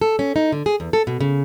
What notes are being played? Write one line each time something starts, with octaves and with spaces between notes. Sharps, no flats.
A4
C#4
D#4
D3
G#4
E2
A4
B2
C#3